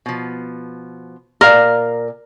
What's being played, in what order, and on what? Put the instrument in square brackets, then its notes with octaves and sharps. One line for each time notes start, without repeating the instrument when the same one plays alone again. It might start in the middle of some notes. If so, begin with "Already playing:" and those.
[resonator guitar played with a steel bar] B2 F3
[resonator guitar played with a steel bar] A#2 D5 F5 [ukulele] A#4